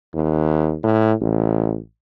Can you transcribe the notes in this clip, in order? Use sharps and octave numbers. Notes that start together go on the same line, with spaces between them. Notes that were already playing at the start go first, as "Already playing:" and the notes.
D#2
A2
A1